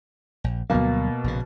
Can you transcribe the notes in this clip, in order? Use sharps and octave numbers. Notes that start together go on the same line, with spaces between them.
A#1
D2 B2 F#3 G3 A#3
A#1 C#3